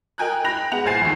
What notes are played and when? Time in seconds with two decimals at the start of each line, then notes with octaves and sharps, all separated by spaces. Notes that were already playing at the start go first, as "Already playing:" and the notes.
0.18 A#4 D#5 G5 G#5 A#5 F#6
0.33 F#6
0.44 G5 B5 F#6 A#6 F7
0.72 G#3 B3 F#5 F7
0.85 C2 A#2 C5 G#5 A6 C7
1.01 A#1 D#2